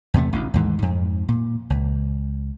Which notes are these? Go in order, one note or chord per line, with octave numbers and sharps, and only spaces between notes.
E2 C3 A3
A1 D2
D#2 G#2 E3
F2 G#2
A#2
C#2